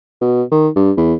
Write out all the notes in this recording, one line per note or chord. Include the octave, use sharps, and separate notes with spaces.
B2
D#3
G2
E2